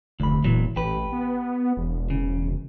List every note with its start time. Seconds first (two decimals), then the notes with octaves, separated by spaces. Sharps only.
0.20 F1 D2 B5
0.44 E1 A#2 E3 F#3
0.76 A1 G4 B4
1.12 B3
1.77 E1
2.10 C#3